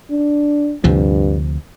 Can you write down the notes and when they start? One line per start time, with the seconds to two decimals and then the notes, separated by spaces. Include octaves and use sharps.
0.11 D4
0.84 D2 G2 C3 F3